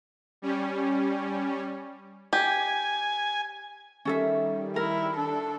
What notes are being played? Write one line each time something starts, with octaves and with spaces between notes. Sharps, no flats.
G3 C#4
G4 G#5
D#3 G3 C#4 A4 E5
E4 A#4
D4 A4